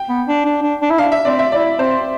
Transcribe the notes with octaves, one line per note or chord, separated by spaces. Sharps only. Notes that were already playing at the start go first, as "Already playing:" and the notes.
Already playing: G5
B3
D4
D4
D4
D4
E4
D4 F5
E5
C4 D5
E5
E4 D5
C4 C5